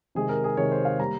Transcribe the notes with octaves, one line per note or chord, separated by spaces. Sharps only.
C3 D#3 G#3 G#4
A#4
G#4
C3 D#3 G#3 C#5
C5
F5
G3 A#3 A#5